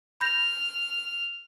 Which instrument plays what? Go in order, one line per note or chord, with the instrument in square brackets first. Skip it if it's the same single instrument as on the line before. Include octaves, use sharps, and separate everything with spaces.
[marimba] B5 G6 A#6 [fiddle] F6